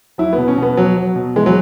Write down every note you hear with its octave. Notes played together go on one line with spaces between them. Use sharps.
F#3 E4
B3
B2
C#4
B2
B3
F#3
F#3
B2
E3 G#3
F#3